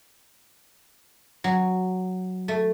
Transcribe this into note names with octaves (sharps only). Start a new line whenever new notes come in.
F#3
A3